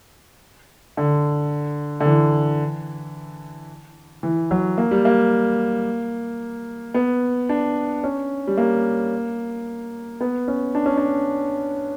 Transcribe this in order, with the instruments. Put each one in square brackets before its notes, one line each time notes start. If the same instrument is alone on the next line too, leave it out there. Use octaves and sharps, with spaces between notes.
[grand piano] D3
D3
E3
E3
F#3
A#3
G3
A#3
B3
D4
C#4
G3
A#3
B3
C#4
D4
C#4
D4